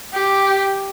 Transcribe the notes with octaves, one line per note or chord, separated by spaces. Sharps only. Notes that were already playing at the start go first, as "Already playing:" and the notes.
G4